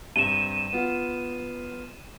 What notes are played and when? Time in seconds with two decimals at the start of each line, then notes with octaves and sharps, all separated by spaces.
0.16 G2 C3 D#7 E7
0.73 B3 F4